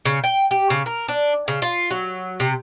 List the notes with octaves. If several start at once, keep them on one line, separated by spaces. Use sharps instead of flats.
C#3
G5
G4
C#3
A#4
D4
C#3
F4
F#3
C3